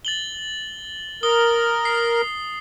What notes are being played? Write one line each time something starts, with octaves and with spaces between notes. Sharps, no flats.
A6 F#7 G7
A#4 D#6 G7
C7